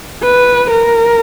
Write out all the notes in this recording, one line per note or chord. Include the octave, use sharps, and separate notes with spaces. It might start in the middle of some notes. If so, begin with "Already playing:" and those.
B4
A#4